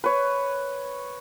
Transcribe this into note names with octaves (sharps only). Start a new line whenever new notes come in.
B4 C#5